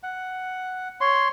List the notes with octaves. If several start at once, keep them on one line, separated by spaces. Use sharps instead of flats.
F#5
C#5 C6